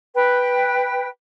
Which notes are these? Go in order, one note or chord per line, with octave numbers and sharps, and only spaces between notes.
B4 G5